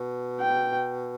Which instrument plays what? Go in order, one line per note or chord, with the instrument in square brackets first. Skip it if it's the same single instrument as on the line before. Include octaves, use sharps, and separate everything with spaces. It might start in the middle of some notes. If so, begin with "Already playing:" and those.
Already playing: [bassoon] B2
[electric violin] G5